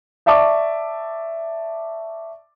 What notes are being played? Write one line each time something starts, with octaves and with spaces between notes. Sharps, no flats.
D5 E5 A5 C#6 D6